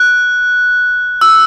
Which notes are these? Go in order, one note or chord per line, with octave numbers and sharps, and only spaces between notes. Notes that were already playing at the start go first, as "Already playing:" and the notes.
Already playing: F#6
E6